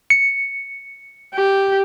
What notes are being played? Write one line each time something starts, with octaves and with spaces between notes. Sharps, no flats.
C#7
G4